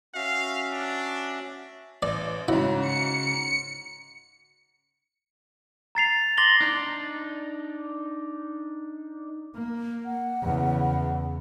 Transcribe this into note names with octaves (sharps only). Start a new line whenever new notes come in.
C#4 F#4 E5 F5
D4
A1 D5
G#2 C#3 E4 F#4
C#7
A#5 A6 C7 F7
C6 D6 A6 A#6 F#7 G7
D4 D#4
A#3
F#5
E2 C#3